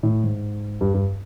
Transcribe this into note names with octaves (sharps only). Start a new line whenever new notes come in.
A2
G#2
G2
G2